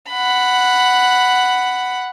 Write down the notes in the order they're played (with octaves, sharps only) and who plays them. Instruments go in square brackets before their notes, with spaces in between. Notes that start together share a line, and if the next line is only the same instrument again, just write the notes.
[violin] F#5 B5